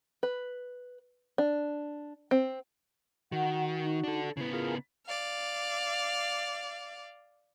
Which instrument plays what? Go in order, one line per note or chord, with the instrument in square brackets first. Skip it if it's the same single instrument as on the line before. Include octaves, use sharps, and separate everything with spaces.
[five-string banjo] B4
D4
C4
[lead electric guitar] D#3 [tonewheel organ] F#4 [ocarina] F#5
[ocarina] D#4
[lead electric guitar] D4 A4
[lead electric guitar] C#3 B3 [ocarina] E4
[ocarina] E4 [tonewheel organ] F4 G#4 A#4
[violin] D5 F5